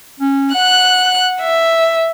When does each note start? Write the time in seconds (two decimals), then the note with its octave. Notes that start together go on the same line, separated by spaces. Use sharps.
0.20 C#4
0.55 F#5 F#6
1.41 E5